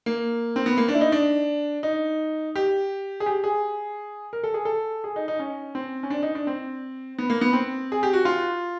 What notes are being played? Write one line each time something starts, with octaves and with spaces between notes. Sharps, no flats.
A#3
C4
B3
A#3
D4
E4
D#4
D4
D#4
G4
G#4
G4
G#4
A#4
A4
G#4
A4
G#4
D#4
D#4
C#4
C4
C#4
D4
D#4
D4
C4
B3
A#3
B3
C4
G#4
G4
F#4
F4